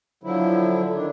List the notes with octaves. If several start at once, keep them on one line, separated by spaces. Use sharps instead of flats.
D3 F3 F#3 E4
D#3 D4